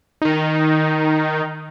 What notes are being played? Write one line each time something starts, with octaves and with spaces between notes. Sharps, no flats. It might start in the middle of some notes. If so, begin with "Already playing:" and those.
D#3 D#4